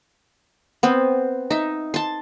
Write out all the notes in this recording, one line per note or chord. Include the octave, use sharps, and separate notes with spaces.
B3 C4
D#4 E5
A5 C6